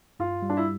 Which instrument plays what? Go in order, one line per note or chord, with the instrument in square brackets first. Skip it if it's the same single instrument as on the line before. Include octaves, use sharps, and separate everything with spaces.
[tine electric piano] G2 [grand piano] F4
[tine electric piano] G3
[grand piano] D4
E4